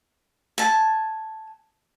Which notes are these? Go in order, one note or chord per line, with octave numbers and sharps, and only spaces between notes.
G#5 A5